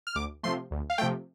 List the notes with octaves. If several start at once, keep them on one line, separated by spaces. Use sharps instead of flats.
F6
D2 D6
C3 F3 A3 C6
D2
F5
C3 F3 A3 G5